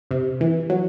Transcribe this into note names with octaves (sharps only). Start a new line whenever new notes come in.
C3
E3
F#3